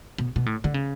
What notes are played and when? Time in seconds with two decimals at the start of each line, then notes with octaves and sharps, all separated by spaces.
0.18 B2
0.36 B2
0.46 A2
0.64 D3
0.74 C#3